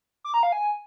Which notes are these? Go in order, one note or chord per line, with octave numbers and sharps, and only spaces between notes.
D6
A#5
F5
G#5